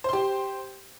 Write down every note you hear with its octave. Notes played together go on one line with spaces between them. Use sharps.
G4 C5 C6